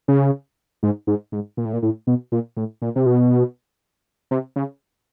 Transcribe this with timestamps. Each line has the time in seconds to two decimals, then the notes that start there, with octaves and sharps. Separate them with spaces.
0.08 C#3
0.83 G#2
1.07 G#2
1.32 G#2
1.57 A#2
1.65 A2
1.73 A#2
1.82 A2
2.07 B2
2.32 A#2
2.57 A2
2.82 A#2
2.96 C3
3.06 B2
4.31 C3
4.56 C#3